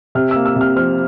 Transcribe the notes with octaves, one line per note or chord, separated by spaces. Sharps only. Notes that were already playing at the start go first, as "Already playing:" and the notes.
C3 F6
A#3 E6
E6
C3 F6
F3 F6